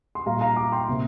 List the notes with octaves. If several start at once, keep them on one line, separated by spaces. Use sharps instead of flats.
C6
A#2 G3 A#3 F5 A#5
F5 A#5
A#5 D6
G5 C6
C3 A#3